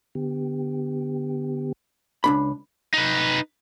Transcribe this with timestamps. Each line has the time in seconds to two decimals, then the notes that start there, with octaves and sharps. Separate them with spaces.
0.15 D3 B3 G4
2.24 C#2 D4 B5
2.94 D#4 B4